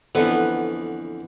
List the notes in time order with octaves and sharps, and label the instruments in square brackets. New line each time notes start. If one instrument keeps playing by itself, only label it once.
[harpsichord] F2 D3 E3 [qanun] B3